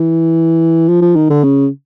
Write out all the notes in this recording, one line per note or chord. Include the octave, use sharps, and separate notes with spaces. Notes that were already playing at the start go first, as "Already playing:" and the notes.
Already playing: E3
F3
F3
D#3
D3
C#3